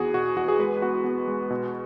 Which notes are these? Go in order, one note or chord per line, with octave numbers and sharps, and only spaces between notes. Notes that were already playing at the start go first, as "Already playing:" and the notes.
Already playing: E2 B3 F#4 G#4
B2 F#4
E2 F#4
G#4
G#3 B4
B3 F#4
B3
G#3
B2